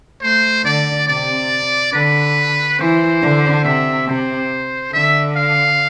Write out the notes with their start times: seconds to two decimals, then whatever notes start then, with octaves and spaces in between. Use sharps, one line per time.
0.22 A3 C5
0.65 D3 D5
1.08 C3 D5
1.93 D3 B4
2.79 E3 C5
3.22 D3
3.65 C3 E5
4.08 C3 C5
4.93 D3 E5
5.36 F5